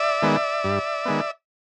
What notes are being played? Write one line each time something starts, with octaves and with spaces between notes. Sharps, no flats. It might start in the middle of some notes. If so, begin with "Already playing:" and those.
Already playing: D5 E5
D#3 G#3 B3
G2
D#3 G#3 B3